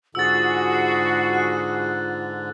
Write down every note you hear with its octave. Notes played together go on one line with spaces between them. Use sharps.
G#2 D3 F4 F#4 G#4 E6 A6
F#6